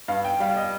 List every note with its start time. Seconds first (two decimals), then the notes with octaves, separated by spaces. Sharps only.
0.08 G2 F5
0.25 G5
0.40 G3 F5
0.57 D#5